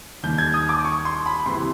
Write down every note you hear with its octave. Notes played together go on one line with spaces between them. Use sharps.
D#2 D#3 G3 G6
G#6
D#6
D6
C#6
C6
B5
C#2 C3 E3 C6